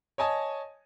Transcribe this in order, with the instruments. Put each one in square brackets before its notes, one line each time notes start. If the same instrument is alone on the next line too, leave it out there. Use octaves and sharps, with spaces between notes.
[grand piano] C#5 D#5 G#5 A5 D#6